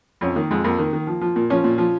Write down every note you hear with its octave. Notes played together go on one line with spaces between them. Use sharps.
F2 C#4
D#3 A#3
F2 G#3
F2 A#3
D#3
D#3
F3
F3
A#2
F3 C#4
A#2
F3